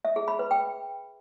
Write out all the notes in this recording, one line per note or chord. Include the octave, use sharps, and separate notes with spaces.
E5
G#4
B5
B4
G5